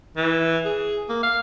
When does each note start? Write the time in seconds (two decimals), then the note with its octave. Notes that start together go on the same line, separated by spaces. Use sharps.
0.17 E3
0.65 G#4
1.09 A#3
1.23 F5